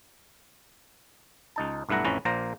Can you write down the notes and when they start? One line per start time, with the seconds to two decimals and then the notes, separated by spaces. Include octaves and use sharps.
1.56 C#2 D#4 A5
1.89 B1 G2 A3 E4 F#5 A#5
2.04 A1 F2 E3 C#4 B4 A#5
2.25 A#1 A#2 A#3 C5 A#5